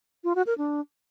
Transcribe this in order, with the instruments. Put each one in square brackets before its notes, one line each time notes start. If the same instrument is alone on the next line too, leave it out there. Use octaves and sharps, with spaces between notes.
[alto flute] F4
F#4
A#4
D4